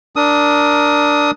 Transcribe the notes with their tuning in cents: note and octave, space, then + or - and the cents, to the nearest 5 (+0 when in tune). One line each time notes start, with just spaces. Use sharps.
D4 +0 A#4 +0 D#6 +20